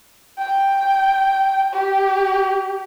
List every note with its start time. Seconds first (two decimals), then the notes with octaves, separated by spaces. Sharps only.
0.38 G5
1.73 G4